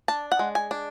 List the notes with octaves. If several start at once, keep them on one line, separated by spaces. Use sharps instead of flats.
D4 A5
F#5
G#3
G#5
D4